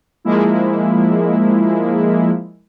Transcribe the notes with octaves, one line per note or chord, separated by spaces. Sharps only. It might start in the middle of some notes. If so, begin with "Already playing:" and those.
F3 G#3 A#3 E4